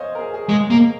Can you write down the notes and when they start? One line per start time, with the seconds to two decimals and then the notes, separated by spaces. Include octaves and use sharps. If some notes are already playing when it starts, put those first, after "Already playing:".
Already playing: C5 C#5 D#5 F5 G#5
0.15 A#4
0.18 G#4
0.34 G#4
0.49 G#3
0.70 A#3